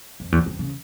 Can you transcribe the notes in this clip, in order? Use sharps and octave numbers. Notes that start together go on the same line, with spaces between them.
F2
E2
F2
C#3